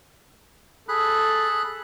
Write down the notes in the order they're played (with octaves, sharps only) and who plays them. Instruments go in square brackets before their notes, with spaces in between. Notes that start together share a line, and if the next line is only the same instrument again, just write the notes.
[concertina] G#4 B5 F#6 [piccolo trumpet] A4